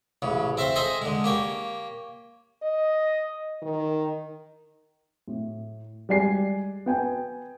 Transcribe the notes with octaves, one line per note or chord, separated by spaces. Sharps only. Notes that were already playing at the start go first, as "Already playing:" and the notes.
A1 C#3
C4 E5 F5 C6
G#4 A4 C5 D#5 E5 C6
D3 G#3
A#3 G4 C#5
D#5
D#3
A2
G3 G#3 D5 G#5 C7
B3 G5 G#5